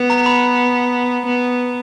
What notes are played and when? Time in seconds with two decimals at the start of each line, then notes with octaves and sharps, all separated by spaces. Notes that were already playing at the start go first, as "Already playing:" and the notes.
Already playing: B3
0.10 A#5
0.26 B5
1.26 B3